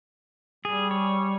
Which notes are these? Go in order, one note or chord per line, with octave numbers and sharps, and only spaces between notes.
G3 G#4
C#5